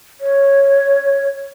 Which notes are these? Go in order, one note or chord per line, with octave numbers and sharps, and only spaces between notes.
C#5